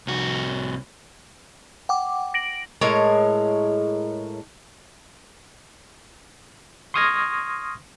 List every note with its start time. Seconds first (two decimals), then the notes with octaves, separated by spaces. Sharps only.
0.07 C2 F#4
1.89 F#5 G5 D6
2.34 A#6 D7 F#7
2.81 A2 G#3 A#4 C#5
6.94 C6 C#6 D#6 F6 G#6 A#6